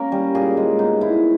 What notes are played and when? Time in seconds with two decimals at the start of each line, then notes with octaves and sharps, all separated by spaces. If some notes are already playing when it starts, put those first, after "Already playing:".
Already playing: A#3 C#4 A#4
0.12 G3
0.35 A#2 G#4
0.57 G#3
0.79 B3 D#4
1.01 A#2 E4